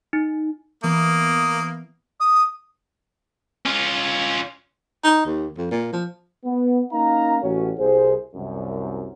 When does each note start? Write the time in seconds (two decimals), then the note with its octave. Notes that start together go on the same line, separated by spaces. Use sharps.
0.13 D#4
0.84 E3 A#3 B3 D#6
2.20 D#6
3.66 C#4 F4
5.04 D#4
5.26 D#2
5.58 F2
5.71 A#2
5.93 F3
6.45 B3
6.93 A#3 C#4 D#4 F5 A#5
7.42 A1 C#4 F#4
7.79 C2 G#4 C5
8.35 C2 F#2